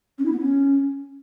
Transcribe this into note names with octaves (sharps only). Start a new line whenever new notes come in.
C#4
E4
B3
C#4